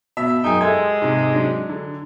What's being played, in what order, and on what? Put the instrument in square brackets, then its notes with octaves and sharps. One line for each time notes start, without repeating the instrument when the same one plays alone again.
[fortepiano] B2 [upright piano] E5
[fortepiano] F#2 G#4 [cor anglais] D#4 [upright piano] G5 G#5
[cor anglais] G#3 [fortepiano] G4 A4 E5 [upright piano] G#6
[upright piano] G#2 C3
[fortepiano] F#3 D4
[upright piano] D3